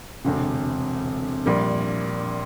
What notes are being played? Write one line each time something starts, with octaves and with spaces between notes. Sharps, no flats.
E1 D2 C3
A#1 A#2 G3 A#3